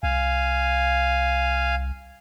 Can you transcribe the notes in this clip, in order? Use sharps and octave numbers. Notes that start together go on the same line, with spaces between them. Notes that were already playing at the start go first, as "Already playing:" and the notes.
C2 F5 G#5